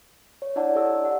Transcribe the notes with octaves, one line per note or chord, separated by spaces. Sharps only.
C#5
D4 E4 C#5 D5 F#5 A5
G4 A4 D5 D#5 E6
A4
F#5